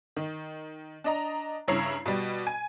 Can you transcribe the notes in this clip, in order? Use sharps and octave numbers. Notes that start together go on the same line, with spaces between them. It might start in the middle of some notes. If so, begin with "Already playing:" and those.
D#3
D4 D#5 A#5
G2 C#3 E4 C#5 A#5 C7
B2 G3
G#5